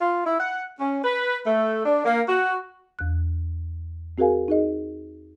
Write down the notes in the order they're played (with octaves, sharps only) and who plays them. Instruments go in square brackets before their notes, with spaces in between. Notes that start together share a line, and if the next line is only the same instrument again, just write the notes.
[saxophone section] F4
E4
F#5
C#4
B4
A3
D4
A#3
F#4
[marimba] E2 F#6
C4 F#4 G#4 A#4 F5 G#5
D#4 G#4 D#5